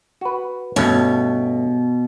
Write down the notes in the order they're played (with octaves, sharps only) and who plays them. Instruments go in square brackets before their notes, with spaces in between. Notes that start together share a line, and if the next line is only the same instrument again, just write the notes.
[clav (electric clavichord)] F#4 B4
[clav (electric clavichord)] G2 A3 C#4 [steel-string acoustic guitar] B2